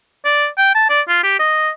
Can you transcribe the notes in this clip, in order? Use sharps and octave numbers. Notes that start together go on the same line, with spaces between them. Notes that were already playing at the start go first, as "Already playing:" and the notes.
D5
G5
A5
D5
F4
G4
D#5